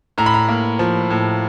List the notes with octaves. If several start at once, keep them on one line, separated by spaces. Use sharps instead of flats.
A2 A#5
B5
A#5
A#3
F3
A2